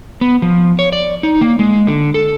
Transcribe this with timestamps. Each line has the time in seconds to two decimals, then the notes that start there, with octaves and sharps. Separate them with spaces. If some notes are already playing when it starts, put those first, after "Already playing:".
0.21 B3
0.42 F3
0.79 C#5
0.92 D5
1.23 D#4
1.41 A#3
1.59 G#3
1.87 D3
2.14 A4